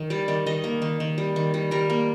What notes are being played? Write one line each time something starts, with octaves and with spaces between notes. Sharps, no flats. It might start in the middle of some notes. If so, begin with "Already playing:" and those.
Already playing: D#3
G3 D5
D#3 D5
D#3 D#5
A#3
D#3
D#3
G3
D#3
G3
G3 A#4
A#3